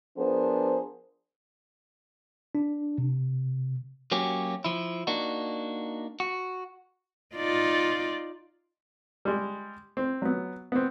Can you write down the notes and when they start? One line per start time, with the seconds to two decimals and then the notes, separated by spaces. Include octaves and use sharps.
0.18 F3 B3 D4 G#4 A#4 C5
2.55 D4
2.98 C3
4.11 F#3 A#3 C#4 F#4 G4
4.64 F3 E4
5.07 A#3 D4 D#4 F#4
6.20 F#4
7.36 D#4 F4 D5
9.25 G3 G#3
9.97 C4
10.22 F#3 B3
10.72 B3 C4